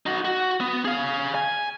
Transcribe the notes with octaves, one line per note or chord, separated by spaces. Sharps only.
D#4 F#4
F#4
B3
G#4 F5
G#5